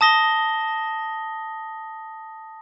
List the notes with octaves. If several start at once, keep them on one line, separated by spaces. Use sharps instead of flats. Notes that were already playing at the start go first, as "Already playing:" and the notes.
A5 D#6 A#6 G7